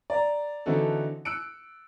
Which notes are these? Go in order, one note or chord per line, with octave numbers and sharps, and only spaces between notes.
D5 A#5
D3 E3 C4 D#4 F#4 A4
E6 F#6 C#7 D7